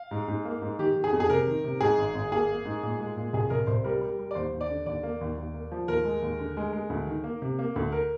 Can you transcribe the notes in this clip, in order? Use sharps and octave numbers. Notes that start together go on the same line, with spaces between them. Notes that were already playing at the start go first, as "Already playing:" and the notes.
Already playing: F5
G#2
G#2
A#3
G#2
D#3 G4
D#3
G#4
F2
G#4
C3 A#4
D#3
C3
G#2 G#4
G#1
G#1
A#3 G#4
A#3
G#2
A#2
G#3
A#2
C2 G#4
C2 A#4
C2 C5
G3 A#4
G3
G3
D5
D#2 C5
D#2
D5
D3
D#2 D5
A#3
D#2
D#2
A#3
F3
D#2 A#4
G#3
D#2
D3
G#3
G#3
D2
D#3
A#3
C3
A#3
D2
A#4